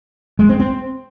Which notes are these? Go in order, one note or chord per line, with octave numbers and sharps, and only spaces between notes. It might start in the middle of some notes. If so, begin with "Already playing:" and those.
G#3
C4
C4